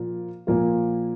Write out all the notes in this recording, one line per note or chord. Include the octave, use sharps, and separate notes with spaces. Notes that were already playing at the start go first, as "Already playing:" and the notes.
Already playing: A#2 F3 A#3 F4
A#2 F3 A#3 F4